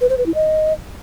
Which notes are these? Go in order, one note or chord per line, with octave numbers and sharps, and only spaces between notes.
B4
C5
B4
E4
D#5